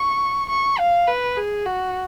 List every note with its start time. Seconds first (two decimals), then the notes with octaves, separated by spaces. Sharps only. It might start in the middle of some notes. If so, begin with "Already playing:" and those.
Already playing: C#6
0.50 C#6
0.79 F5
1.08 B4
1.37 G#4
1.66 F#4